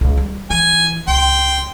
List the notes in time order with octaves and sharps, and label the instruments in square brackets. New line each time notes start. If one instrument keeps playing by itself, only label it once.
[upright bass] C#2
G3
[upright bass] E3 [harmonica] G#5
[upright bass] C#2 [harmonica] G5 C6